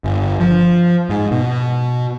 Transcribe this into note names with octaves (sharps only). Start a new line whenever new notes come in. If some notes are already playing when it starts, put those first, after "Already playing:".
G1
F3
G#2
B2